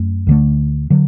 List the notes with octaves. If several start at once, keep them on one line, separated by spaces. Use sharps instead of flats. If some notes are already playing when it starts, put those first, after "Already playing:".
Already playing: F#2 A3
D2 D3 A3
D3 F#3